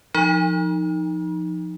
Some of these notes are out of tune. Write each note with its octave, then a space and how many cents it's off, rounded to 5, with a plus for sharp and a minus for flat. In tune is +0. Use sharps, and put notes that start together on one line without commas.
F3 +0 D#4 +0 A#5 +45